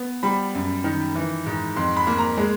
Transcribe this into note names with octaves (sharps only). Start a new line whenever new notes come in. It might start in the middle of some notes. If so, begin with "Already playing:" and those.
Already playing: B3
G3 B5
F#2
D#3
E3
G#2
F2 C6
B5
A#3
A#5
G#3